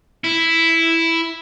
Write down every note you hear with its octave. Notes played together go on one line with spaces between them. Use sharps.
E4